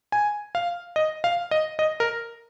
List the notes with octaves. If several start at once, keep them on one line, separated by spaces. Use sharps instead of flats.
G#5
F5
D#5
F5
D#5
D#5
A#4